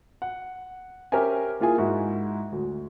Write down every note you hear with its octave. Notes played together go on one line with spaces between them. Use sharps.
F#5
C#4 G4 A#4 C5 E5 G#5
A#3 E4 F4 G#4 G#5
G#2 E4 F#4
D2